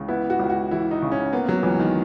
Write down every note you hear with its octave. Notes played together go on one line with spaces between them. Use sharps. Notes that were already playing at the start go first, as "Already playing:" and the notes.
Already playing: C#2 C#3 E3
B3 E4
F#4
C#2
F#4
E3 E4
D#4
C#3
C#4
A#3 B3
F#3
C#2 E3
D#3